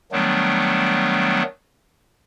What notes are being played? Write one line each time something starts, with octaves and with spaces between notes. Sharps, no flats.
D#3 F#3 G3 A3 B3 D4